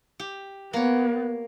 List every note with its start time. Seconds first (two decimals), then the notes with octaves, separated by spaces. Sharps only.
0.20 G4
0.73 A#3 B3 C#5